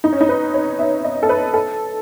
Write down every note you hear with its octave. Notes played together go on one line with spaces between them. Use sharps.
D#4
C#4
D#4
B4
C#5
E5
D#5
A4
B4
A4